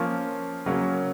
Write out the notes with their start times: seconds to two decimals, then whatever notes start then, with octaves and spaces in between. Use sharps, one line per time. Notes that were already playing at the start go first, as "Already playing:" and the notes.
Already playing: F3 A#3 C#4 F4
0.66 C#3 F#3 A#3 C#4